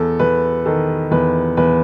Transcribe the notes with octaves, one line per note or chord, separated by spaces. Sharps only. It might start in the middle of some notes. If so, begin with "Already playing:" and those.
Already playing: E2 A4
E2 B4
D#3 A4
E2 B4
E2 B4